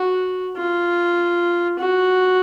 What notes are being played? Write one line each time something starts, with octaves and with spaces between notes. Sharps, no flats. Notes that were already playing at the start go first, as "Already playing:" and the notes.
Already playing: F#4
F4
F#4